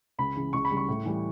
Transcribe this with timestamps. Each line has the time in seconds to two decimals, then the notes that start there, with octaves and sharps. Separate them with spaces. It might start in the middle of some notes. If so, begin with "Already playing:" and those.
0.18 C#2 B5
0.36 C#3 E3
0.53 C#2 C#6
0.65 B5
0.71 C#3 G3
0.77 C#6
0.88 A2
1.06 E3 G3